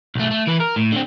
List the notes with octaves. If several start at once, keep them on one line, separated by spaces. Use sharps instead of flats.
B1 A3
A3
E3 B4
A#4
A2
D3 C4